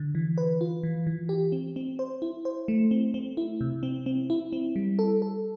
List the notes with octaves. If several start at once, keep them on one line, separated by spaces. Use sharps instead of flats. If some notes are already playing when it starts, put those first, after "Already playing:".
Already playing: D3
E3
B4
F4
E3
E3
G4
C4
C4
C5
E4
C5
A3
C4
C4
E4
C3
C4
C4
E4
C4
G3
A4
A4